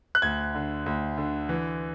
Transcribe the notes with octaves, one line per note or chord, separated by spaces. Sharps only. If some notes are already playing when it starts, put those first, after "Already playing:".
F#6
D2 G#6
D3
D2
D3
E3